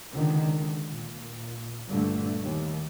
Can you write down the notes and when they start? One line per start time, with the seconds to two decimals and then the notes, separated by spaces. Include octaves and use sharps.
0.14 C#2 D3 D#3
0.89 A#2
1.87 G2 A#2 D3 A3
2.42 D#2